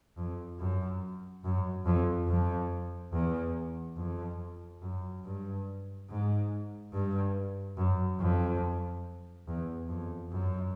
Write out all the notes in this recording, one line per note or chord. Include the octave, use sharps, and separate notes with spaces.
F2
F#2
F#2
F2
F2
E2
F2
F#2
G2
G#2
G2
F#2
F2
E2
F2
F#2